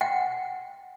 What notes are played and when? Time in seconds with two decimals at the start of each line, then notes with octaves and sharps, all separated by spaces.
0.01 F#5 G5